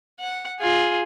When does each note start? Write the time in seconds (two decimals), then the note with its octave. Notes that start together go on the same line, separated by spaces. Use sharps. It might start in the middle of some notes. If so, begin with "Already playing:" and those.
0.20 F#5
0.60 F4 G#4